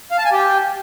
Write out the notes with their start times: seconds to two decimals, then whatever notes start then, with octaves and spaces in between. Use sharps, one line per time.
0.11 F5
0.18 A5
0.25 G#5
0.32 G4